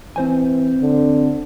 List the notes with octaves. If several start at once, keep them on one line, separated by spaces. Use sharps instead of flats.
E3 C4 C5 G#5
D3